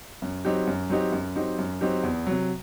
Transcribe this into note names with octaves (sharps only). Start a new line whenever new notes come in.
F#2
F#3 C4 D#4 G4
F#2
F#3 C4 D#4 G4
F#2
F#3 C4 D#4 G4
F#2
F#3 C4 D#4 G4
E2
C3 F#3